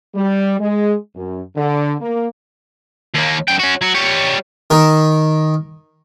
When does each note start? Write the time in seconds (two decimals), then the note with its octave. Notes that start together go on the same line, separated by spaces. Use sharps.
0.15 G3
0.60 G#3
1.16 F#2
1.56 D3
2.01 A#3
3.14 D#2 A#3
3.48 F#2 G5
3.59 C#4 F#4
3.81 F#3 F#4
3.94 G3 C#5
4.70 D#3 A#4